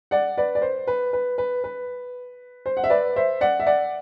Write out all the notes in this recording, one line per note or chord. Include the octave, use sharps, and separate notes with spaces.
D5 F#5
B4 D5
D5
C5
B4
B4
B4
B4
C5
F#5
E5
B4 D5
C5 E5
D5 F#5
E5
D5 F#5